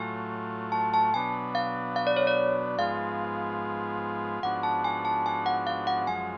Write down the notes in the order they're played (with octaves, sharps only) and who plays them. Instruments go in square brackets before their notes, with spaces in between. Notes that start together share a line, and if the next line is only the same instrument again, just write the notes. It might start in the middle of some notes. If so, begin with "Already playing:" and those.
Already playing: [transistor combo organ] A2 F#3 A3 F4 [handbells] G#5
[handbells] A5
A5
[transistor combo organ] B2 F#3 B3 D4 [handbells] G#5
[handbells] F5
F5
D5
C#5
D5
[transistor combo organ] G#2 F3 G#3 B3 F4 [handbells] F5
[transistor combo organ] G#2 F3 B3 D4 F#4 [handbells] F#5
[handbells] A5
G#5
A5
G#5
F#5
F5
F#5
[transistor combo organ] F#2 F3 G#3 [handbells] G#5